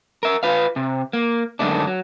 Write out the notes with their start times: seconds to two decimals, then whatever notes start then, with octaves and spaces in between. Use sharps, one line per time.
0.23 A#4 E5
0.43 F4 B4 F5
0.76 C3
1.13 A#3
1.59 F#2 D3 D#3 G#3 A3 D4
1.87 F#3